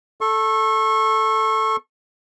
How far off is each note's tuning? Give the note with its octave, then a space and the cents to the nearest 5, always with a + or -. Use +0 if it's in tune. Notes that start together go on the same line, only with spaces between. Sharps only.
A4 +0 C#6 -30